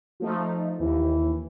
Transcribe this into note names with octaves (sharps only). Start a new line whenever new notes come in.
F3 A3 D#4
D#2 E3